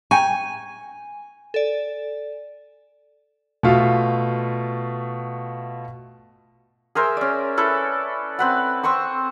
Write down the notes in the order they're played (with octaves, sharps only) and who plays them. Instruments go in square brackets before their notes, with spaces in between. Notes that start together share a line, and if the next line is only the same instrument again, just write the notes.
[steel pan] G5 A#5 C#6 [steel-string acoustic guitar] G#5
[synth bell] A4 D5
[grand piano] B2 A3 F4 F5
[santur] G#4 A#4 C5 E5
C#4 D5
E4 A4 B4
C4 B4 F#5
C4 C5 C#6 D#6